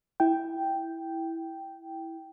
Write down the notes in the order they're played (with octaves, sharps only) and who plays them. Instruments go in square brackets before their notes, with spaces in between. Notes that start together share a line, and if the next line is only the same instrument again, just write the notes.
[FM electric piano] E4 G5